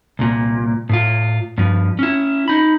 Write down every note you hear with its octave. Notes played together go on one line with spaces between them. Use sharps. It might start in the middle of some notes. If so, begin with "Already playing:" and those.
C2 A#2
A2 F4
G2 F3
C#4 E4
D#4 B5